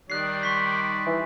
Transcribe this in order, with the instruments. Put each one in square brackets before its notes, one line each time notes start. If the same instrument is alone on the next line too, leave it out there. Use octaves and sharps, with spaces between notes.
[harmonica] D#3 G3 D5 [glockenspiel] F#6 C7
[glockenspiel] C6 C#6 B6
[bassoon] E3